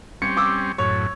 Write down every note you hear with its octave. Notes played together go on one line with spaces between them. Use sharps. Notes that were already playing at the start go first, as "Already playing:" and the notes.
G3 C4 C#4 C#7
D6 E6
F#2 A2 C#5